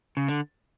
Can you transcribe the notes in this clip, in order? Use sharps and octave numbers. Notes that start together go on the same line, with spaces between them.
C#3
D3